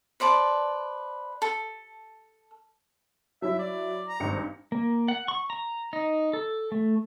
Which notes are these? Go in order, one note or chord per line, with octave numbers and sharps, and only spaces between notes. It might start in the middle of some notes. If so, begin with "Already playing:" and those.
B4 C5 D5 A5
A4
F#3 E4 E5
D5
A#5
G#1 G2 C#7
A#3
F#5
C#6
A#5
D#4
A4
A3